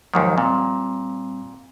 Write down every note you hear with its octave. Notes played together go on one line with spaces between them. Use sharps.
D#2 G#2 D#3 F3 F#3
A#2 G3 C4